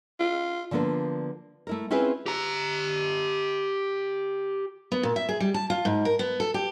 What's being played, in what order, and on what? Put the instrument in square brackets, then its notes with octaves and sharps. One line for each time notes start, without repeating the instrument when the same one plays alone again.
[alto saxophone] F4
[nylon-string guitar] D3 F3 A#3 B3 D4
A3 E4 A#4
C4 C#4 E4 F4 G#4 B4
[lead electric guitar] G4 A#5
[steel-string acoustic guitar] B3
A#2
E5
G#4
G3
A5
F4
G#2
A#4
B3
A4
G4